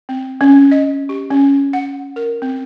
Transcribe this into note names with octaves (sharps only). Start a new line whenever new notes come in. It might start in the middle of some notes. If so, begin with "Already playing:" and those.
C4
C#4
D#5
G4
C#4
F#5
A#4
C4